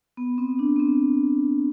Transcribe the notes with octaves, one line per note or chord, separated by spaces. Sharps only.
B3
C4
D4
B3
C4